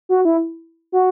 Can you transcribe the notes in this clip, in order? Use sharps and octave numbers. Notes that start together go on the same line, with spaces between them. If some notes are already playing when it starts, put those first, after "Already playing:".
F#4
E4
F#4